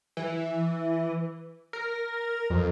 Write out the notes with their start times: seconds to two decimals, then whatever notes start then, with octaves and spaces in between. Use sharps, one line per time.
0.17 E3
1.73 A#4
2.50 F2